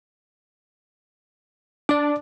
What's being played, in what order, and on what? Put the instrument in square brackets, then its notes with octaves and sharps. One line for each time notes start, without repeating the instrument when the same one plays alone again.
[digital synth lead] D4 [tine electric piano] D5 D6